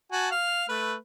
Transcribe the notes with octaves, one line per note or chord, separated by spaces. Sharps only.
F#4 G#5 A5
F5 F6
A3 B4